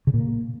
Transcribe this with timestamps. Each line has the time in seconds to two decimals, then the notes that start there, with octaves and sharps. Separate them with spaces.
0.07 C#3
0.14 A#2
0.20 A#3